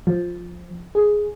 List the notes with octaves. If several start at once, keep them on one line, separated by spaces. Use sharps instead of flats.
F3
G#4